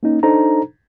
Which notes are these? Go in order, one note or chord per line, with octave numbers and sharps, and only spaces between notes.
A#3 C#4 D#4
D4 D#4 A4 C5 A#5